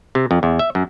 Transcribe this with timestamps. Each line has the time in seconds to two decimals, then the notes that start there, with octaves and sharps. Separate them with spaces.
0.15 C3
0.31 F2
0.43 E2
0.59 E5
0.75 F#2